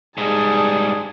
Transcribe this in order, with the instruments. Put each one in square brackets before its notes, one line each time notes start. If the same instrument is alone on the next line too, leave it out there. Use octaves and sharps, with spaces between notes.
[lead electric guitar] G#2 G3 [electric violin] G#4 A5